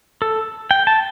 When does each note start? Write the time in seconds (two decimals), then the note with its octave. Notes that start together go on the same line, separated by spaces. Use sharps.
0.22 A4
0.71 G5
0.87 A5